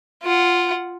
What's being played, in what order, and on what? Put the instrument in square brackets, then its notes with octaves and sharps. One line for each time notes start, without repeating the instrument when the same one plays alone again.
[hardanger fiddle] F4 F#5